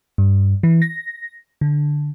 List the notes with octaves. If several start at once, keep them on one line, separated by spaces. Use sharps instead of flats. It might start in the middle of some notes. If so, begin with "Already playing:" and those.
G2
E3
A#6
D3